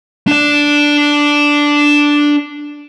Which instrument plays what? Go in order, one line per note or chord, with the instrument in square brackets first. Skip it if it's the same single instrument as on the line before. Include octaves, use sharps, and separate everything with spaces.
[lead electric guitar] D4 D5